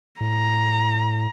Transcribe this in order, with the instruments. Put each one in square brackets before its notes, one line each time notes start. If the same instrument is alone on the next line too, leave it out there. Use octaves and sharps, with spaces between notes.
[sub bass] A2 [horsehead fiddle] A#5